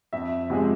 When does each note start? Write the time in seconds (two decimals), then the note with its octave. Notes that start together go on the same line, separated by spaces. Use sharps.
0.13 F2 E5
0.50 C3 F3 G#3